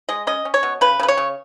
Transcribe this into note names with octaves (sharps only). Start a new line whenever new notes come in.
G#3 D#5
C#4 D#5
C#4
C#5
B2
C#3 B4
C#3 B4
C#5
C#3